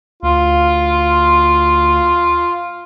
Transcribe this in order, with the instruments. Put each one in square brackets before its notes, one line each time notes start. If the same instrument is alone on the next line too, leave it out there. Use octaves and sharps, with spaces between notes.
[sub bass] D2 [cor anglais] F4